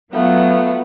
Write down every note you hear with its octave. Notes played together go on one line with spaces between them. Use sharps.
F#3 A3 B3 F4